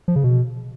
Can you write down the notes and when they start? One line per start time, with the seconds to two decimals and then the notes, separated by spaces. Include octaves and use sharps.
0.08 F3
0.16 C#3
0.24 B2